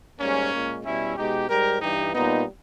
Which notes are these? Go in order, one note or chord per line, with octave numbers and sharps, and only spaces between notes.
G#2 G3 A#3 C#4
A#2 G#3
B2 G3 C#4 E4
B2 G#3 D#4 G4
G#2 G3 G4 A#4
G2 E3 G3 D#4 G4
A#2 G3 B3 D#4